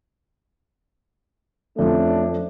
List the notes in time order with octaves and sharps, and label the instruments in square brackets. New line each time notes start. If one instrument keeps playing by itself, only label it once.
[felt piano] F2 F3 [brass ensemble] A3 C#4 D4